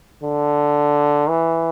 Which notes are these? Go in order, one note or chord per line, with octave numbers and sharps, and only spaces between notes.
D3
E3